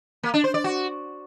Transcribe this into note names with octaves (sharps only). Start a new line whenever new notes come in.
A#3
D4
C5
D5
F#4